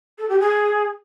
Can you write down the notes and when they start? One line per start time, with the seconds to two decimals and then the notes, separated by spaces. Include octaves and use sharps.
0.18 A4
0.29 G4
0.39 G#4